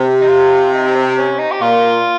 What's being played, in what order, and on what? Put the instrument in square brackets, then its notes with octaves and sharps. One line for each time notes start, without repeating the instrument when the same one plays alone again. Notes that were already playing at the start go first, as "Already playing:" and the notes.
Already playing: [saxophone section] C3
[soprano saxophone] D#4
F4
D#4
C4
C#4
D#4
G4
[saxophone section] A#2 [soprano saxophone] F4